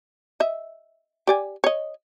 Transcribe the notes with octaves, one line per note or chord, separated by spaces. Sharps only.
D#5 E5
G4 D5 G#5
C#5 D#5